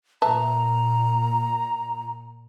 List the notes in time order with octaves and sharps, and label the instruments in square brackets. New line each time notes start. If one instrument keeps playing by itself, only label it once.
[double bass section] A#2 [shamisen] B4 E5 A5 [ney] A#5